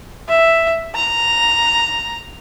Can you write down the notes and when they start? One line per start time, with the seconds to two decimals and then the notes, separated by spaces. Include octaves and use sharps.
0.29 E5
0.95 A#5